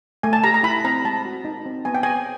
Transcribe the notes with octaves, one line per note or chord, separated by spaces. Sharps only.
A3 G#5
A5
G4 A#5
A#5
E4 B5
C4 A#5
G#3 A5
F#4
D#4
C4
B3 G#5
G5
B3 G#5